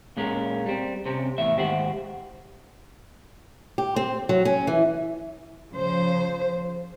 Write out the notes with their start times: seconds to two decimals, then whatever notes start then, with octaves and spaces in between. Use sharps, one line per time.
0.17 A#2 G#3 C#4 A#4
0.66 G3 C4
1.06 C3 C4 C#4
1.38 E2 A2 E5
1.56 D#2 G#2 G4 C5 F#5
3.78 G4
3.96 C4
4.29 F#3
4.45 C#4
4.67 E3
5.71 C#3 F3 C5